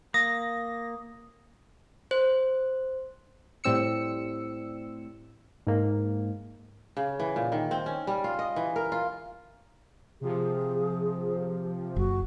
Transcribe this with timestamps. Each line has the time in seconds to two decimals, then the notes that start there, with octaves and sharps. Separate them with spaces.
0.14 A#3 D#6 A#6
2.11 C5
3.64 A2 G3 C4 E6 C#7
5.67 G#2 A#3
6.97 C#3
7.20 E3
7.36 A#2
7.52 D#3
7.71 C4
7.86 C#4
8.07 G3
8.24 F4
8.39 D#5
8.56 E3
8.76 A#4
8.92 F4
10.21 C3 F3 G#4
11.96 F#1 F#4